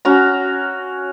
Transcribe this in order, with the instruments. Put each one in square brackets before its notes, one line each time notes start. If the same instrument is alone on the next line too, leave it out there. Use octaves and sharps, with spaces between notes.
[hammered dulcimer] C#4 F#4 A#5